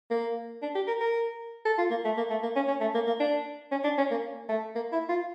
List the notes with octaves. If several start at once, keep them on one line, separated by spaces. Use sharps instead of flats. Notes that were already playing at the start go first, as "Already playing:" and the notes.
A#3
D4
G4
A#4
A#4
A4
F4
A#3
A3
A#3
A3
A#3
C#4
C#4
A3
A#3
A#3
D4
C#4
D4
C#4
A#3
A3
A#3
E4
F4